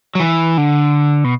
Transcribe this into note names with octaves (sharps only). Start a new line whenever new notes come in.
F#3
E3
D3
B2